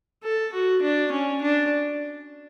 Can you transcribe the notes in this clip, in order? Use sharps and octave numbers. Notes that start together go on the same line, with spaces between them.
A4
F#4
D4
C#4
D4